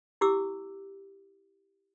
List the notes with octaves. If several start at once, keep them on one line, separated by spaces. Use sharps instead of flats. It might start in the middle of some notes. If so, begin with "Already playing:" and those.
E4 G4 D6 E6